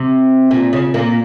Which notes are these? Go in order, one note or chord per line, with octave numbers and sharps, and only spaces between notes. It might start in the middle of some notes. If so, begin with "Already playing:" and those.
Already playing: C3
A#2
C#3
A#2 A#3